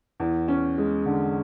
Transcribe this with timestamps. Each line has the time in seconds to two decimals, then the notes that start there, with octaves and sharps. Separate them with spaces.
0.20 E2
0.48 C#4
0.78 G#3
1.06 D3